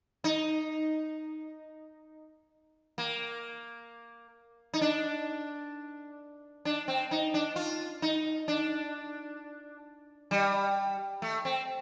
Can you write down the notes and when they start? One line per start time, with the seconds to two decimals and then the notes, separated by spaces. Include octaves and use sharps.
0.24 D#4
2.98 A#3
4.74 D#4
4.81 D4
6.65 D4
6.88 C4
7.11 D#4
7.34 D4
7.56 F4
8.02 D#4
8.48 D4
10.31 G3
11.22 A3
11.45 C4